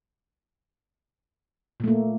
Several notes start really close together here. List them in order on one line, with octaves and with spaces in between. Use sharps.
A#2 A3 A#3